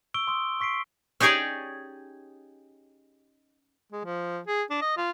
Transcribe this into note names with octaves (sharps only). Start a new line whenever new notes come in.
C#6 E6 D7 G7
C6 D#6 E6
C#6 B6 C7 D7
C#4 D#4 G4 G#4 C#5 D5
G#3
F3
G#4
D4
D#5
F4